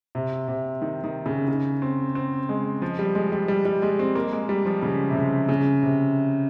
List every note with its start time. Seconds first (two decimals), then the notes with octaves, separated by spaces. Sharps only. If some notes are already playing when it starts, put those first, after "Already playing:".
0.15 C3
0.48 C3
0.82 D#3
1.04 D#3
1.26 C#3
1.48 C#3
1.82 C4
2.15 C4
2.49 G#3
2.82 F3
2.99 G3
3.15 G#3
3.32 G3
3.48 G3
3.65 G3
3.82 G#3
3.99 C4
4.15 A#3
4.32 G#3
4.49 G3
4.65 F3
4.82 C#3
5.10 C3
5.16 C#3
5.49 C#3
5.83 C3